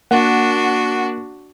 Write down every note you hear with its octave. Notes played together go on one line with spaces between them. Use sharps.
A#3 D4 F#4 F#5